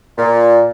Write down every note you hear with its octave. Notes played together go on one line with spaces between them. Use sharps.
A#2